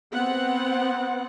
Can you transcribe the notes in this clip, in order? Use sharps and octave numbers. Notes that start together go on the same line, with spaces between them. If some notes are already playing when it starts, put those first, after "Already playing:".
B3 C4 F#5